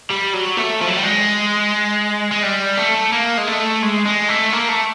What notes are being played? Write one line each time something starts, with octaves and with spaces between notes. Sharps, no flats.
G3
F#3
A3
F3
F#3
G3
G#3
G#3
G3
A3
A#3
G#3
A3
G#3
G#3
A3
A#3
A3